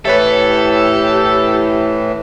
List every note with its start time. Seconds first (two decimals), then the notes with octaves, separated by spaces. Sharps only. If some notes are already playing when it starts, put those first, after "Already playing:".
0.05 A2 E3 G4 A4 B4 C#5 E5